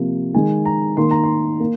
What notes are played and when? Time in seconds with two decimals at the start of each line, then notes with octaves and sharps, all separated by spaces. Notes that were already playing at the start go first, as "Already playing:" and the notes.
Already playing: C3 F3 A#3
0.34 D#3 G#3 G#5
0.65 A#5
0.97 D#3 A#3 C6
1.11 A#5
1.24 C6
1.60 A#3